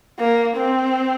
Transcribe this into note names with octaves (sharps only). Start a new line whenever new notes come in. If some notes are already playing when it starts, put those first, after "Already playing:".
A#3
C4